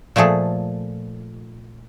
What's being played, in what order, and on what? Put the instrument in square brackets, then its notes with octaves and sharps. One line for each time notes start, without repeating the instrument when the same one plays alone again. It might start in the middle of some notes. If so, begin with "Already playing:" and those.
[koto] A#2 F3 A3 G#4 A4